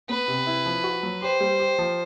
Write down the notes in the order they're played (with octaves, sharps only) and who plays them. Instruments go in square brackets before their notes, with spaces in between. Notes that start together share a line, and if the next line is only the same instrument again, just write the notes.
[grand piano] B3 [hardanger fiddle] B4
[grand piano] C3
E4
F3
F#4
F#3
[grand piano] G4 [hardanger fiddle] C5
[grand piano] G3
G4
F3